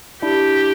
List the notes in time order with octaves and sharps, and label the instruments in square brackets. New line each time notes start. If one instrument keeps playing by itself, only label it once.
[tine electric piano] D4 E4 [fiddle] G4